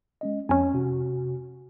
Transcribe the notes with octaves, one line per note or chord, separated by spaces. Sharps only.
G#3 C#4 D#5
F2 C#4 G#5
C3 F#4